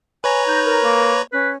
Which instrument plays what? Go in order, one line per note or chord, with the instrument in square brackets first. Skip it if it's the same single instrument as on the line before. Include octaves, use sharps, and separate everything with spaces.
[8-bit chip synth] B4 C#5 A#5 [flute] G#5
[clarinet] D#4 [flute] G6
[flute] A#4
[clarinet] A#3
[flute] C#4 [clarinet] B4